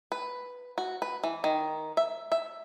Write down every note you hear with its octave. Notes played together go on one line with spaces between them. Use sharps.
B4
F#4
B4
E3
D#3
E5
E5